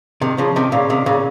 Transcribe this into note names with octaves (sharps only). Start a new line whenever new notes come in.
C3 D#3
C#3 F3
C3 D#3
A#2 C#3
C3 D#3
A#2 C#3